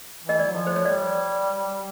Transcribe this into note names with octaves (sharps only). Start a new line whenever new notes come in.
E3
D#5
D5
F#3
F3
C5
C#5
G3 D5